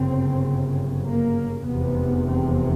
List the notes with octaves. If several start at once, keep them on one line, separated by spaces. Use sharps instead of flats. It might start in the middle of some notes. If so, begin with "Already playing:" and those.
Already playing: G1 F#2 C#3 C4
A#3
F1 E2 C3 B3
C4